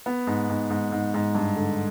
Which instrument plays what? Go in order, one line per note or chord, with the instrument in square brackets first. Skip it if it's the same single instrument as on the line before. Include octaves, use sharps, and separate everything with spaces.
[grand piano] B3
G#2
G#2
G#2
G#2
G#2
G2
D3